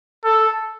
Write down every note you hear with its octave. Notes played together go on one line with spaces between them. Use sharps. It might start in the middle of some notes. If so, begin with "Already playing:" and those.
A4